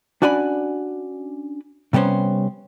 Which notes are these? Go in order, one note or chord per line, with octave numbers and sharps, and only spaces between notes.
C#4 D4 F#4 D5 G#5 B5
C3 G3 B3 C#4 C5